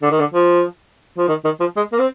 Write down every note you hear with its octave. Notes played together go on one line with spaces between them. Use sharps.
D3
D#3
D3
F3
F3
D#3
D#3
F3
G#3
A#3
C4